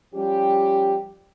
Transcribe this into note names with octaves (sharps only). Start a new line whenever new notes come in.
F3 G3 C#4 G4